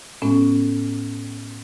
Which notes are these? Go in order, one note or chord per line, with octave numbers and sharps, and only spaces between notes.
A2 G#3 B3 C#4